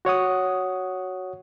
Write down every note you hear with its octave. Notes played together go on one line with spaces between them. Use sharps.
F#4 C#5 F#5 D#6